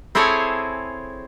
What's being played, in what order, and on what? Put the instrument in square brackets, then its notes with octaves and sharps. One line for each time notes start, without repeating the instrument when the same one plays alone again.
[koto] C4 E4 G#4 A4 C#5 G#5